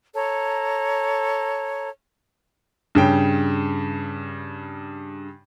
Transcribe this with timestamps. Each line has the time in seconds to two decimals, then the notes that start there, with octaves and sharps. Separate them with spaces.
0.15 A4 C#5 A#5
2.95 G2 C#3 G5